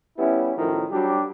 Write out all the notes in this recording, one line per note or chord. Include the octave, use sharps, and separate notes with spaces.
G3 B3 C#4 E4
F#2 A2 D#3 F3
F#3 G3 D4 F#4 G4